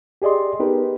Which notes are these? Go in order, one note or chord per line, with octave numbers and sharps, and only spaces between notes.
G4 G#4 D5 D#5 C6
B3 D#4 G4 G#4 A#4 B4